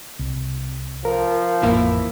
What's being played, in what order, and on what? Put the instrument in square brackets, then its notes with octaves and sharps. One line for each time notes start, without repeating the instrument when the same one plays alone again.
[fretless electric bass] C2
[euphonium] F3 [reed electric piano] A#4
[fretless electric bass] A1 F2 [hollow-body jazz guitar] E3 A#3 E4